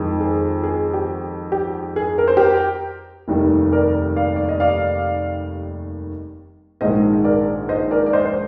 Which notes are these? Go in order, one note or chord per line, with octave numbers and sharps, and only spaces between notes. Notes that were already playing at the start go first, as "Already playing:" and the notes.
Already playing: F2 D#3 G#3
G#4
G#4
G4
G4
G#4
A#4
C5
G4 A#4
F1 D#2 D#3 G3
A#4 D5
D5 F5
D5
D#5
D5 F5
A#1 G#2 D#3 G#3 C5 D#5
A#4 D5
C5 D#5
A#4 D5
D5
C5 D#5
C5